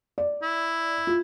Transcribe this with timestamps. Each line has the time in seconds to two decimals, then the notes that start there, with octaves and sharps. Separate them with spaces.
0.18 D5
0.43 E4
1.07 F4